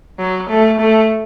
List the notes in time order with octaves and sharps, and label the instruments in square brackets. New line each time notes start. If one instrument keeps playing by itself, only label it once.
[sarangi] F#3
A3
A3